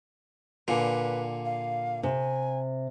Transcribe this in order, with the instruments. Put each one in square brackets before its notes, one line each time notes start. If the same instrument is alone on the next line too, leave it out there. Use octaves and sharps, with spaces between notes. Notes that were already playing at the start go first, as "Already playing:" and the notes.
[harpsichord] A#2 D3 [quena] B4 [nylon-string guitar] G#5
[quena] F5
[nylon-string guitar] C3 [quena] G#5